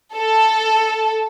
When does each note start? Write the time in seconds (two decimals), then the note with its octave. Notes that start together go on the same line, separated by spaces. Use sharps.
0.15 A4